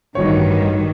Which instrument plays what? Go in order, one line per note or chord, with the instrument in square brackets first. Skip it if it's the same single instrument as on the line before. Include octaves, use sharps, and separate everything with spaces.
[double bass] A1 G2 [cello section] D#3 G3 [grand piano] D#4 F#4 C#5